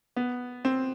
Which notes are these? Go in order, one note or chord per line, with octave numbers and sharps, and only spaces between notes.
B3
C4